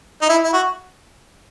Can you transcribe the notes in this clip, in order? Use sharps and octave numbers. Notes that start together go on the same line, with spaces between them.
D#4
E4
E4
F#4